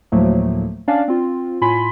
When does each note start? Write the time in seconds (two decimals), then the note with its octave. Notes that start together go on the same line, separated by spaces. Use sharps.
0.12 D2 A2 F3 F#3 A3 A#3
0.88 C#4 D4 D5 F5
1.08 C4 F4
1.61 A2 F4 G#5 B5 C6 B6